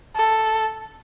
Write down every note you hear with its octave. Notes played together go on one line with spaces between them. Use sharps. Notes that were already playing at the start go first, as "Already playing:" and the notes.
A4